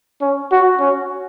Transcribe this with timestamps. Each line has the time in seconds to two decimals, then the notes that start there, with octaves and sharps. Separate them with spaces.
0.21 C#4
0.52 F#4
0.80 C#4